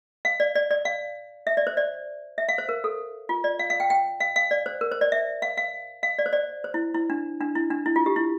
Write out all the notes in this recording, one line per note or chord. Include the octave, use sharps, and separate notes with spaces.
F5
D5
D5
D5
F5
E5
D5
C5
D5
E5
F5
C5
A#4
A4
F4
D5
F5
F5
G5
G5
F5
F5
D5
C5
A#4
C5
D5
E5
F5
F5
F5
D5
C5
D5
C5
E4
E4
D4
D4
E4
D4
E4
F4
G4
E4